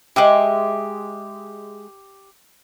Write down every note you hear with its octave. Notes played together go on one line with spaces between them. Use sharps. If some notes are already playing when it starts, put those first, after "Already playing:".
G#3 G4 D#5 E5 D6